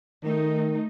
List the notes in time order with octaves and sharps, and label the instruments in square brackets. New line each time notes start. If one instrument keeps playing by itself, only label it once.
[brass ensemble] D#3 [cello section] A3 D#4